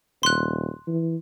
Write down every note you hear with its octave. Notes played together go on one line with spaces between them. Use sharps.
D#1 C6 F#6
E3